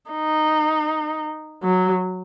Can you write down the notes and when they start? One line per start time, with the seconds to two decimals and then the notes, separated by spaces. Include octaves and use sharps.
0.11 D#4
1.63 F#3